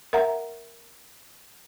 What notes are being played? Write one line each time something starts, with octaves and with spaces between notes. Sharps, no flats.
A#4 E5 F#5 A#5